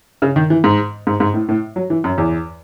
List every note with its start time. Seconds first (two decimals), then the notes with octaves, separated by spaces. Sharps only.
0.22 C#3
0.36 D#3
0.50 E3
0.64 G#2
1.07 G#2
1.20 G#2
1.34 A2
1.49 A2
1.76 F#3
1.90 E3
2.04 F#2
2.18 E2